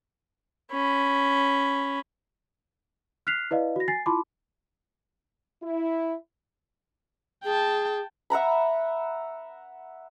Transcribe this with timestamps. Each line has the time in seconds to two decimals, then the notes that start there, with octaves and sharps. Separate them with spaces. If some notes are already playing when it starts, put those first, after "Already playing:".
0.72 C#4 B5
3.27 F6 F#6 B6 C7 F7
3.51 E4 B4 D5 D#5 F5
3.76 F#4 A#6
3.88 G#5 A6 C7
4.06 E4 F4 A5 B5 C6 D6
5.63 E4
7.44 G#4 G5 A5
8.30 E5 F#5 A#5 B5